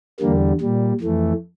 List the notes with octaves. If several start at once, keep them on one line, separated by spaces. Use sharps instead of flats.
E2 D3 G3 A#3
A#2 G3
F2 E3 A3